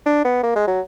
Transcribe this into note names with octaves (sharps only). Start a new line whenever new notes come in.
D4
B3
A#3
G#3
F#3